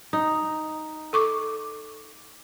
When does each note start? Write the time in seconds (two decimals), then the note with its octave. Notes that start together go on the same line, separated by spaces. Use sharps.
0.13 D#4
1.13 A4 C#6 D6